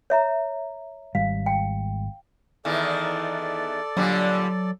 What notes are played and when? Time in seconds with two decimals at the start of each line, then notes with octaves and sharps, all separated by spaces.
0.10 C#5 E5 A#5
1.15 G#1 G3 F5
1.46 G5
2.65 E2 D#3 E3 A4 D5
3.97 A#2 D3 F#3 G3